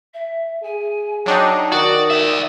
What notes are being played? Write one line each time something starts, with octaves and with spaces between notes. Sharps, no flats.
E5
G#4 G#5
F#3 D4 D#4 G5
D#3 F#4 D5 D#6
D5 E5